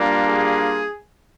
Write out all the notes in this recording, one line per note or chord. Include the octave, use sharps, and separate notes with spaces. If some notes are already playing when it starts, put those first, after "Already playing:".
Already playing: G3 A#3 D4 F4
G#4